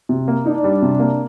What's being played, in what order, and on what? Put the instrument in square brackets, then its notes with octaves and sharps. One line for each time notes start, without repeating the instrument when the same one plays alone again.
[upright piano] C3
A#3
[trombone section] D4 [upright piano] D#4
[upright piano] G3
C3
A#3